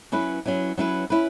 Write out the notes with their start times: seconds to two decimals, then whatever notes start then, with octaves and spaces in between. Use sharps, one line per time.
0.12 F#3 C#4 E4 B4
0.46 F#3 C#4 E4 B4
0.78 F#3 C#4 E4 B4
1.10 C#4 E4 B4